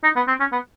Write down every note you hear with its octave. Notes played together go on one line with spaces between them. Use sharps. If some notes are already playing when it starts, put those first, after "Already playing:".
D#4
B3
C4
C#4
B3